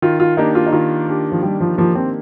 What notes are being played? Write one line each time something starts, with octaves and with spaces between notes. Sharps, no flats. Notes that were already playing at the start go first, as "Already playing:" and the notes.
D#3 F4
F4
A#3 D4 D#4 G4
F4
D#4
D#3 F4
A#3 D4 G4
F3
D#3 G3
F3
F3 A#3 D4 G4
C4